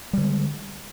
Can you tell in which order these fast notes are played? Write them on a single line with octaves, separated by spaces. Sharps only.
G3 D3 G#3